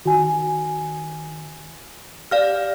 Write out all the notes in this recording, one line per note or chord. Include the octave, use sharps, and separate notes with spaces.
D#3 F#4 G#5
G4 D5 F5 F6